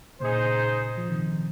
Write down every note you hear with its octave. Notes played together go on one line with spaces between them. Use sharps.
A#2 C#3 D#4 G#4 C5
F3
C3 D#3